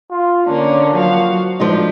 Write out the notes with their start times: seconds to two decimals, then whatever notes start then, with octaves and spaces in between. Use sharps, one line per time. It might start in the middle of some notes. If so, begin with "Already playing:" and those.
0.11 F4
0.46 D3 A#3 C#4 D4
0.94 F3 F#3 F#4 F5
1.60 F3 G#3 D4 D#4 B4